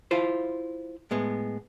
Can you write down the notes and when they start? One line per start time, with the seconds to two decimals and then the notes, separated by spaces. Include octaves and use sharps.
0.11 E4 F4 C5
1.11 A2 G#3 B3